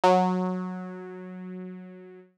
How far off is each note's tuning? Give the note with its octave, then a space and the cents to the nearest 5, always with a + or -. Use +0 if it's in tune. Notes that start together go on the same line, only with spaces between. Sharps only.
F#3 -15